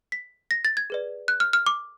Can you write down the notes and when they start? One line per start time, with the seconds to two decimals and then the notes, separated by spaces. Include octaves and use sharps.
0.12 B6
0.51 A#6
0.65 A6
0.77 G#6
0.90 G#4 B4 D5
1.28 F#6
1.40 F6
1.53 F6
1.66 D6